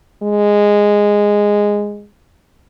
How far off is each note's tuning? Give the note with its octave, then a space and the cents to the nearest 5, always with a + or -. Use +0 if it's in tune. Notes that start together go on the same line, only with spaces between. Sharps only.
G#3 -10